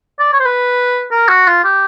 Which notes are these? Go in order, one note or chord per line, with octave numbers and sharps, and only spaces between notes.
D5
C#5
C5
B4
A#4
F#4
F4
G4